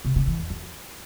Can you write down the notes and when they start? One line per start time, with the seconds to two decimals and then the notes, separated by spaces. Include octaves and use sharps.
0.05 C3
0.16 C#3
0.27 E3
0.39 E2
0.50 F#3